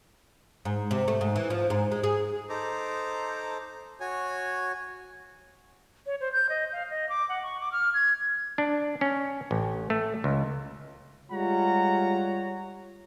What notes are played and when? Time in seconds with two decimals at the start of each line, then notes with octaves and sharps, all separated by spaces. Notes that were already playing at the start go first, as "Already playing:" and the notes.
0.65 G#2
0.91 C3
1.08 A3
1.21 G#2
1.36 E3
1.50 F3
1.70 G#2
1.92 G#3
2.03 G#4
2.49 D#4 A4 C5 A#5 D6
4.00 F#4 C#5 G#5
6.06 C#5
6.21 C5
6.33 G6
6.49 D#5
6.73 F5
6.90 D#5
7.09 D6
7.29 F#5
7.43 C#6
7.60 D6
7.72 F6
7.94 G#6
8.58 D4
9.01 C#4
9.51 A1
9.90 A3
10.24 C#2
11.32 G3 G#3 F4 C#5 F#5 A#5